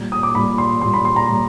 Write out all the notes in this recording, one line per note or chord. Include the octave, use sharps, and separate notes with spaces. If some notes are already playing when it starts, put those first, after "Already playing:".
Already playing: A#2 G3
D#6
D6
A#2 G3 B5
C6
A#2 G3 C6
B5
C6
A#5
A#2 G3